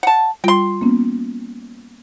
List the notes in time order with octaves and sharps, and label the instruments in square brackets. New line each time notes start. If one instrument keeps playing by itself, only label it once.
[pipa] F#5 A5
[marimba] G3 F4 [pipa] G5 C6
[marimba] A#3 B3 C#4